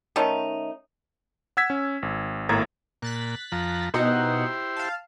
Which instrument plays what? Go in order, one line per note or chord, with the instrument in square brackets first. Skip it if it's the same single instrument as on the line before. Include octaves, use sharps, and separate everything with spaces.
[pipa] D#3 A3 C#4 D#4
[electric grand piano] F#5 E6 G#6 B6
C#4
G#1
G#1 A2 A#3 A#5 G#6 A6
[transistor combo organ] A#2 [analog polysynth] F#6 A6 B6
[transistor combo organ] F2 F3 A#5
[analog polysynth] B2 D#4 F#5 [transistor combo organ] E4 G4 C5
[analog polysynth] F5 A5